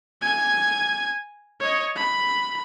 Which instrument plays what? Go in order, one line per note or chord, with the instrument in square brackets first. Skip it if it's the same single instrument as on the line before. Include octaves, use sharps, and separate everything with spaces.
[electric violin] G#5 G#6
C#5 D#5
B5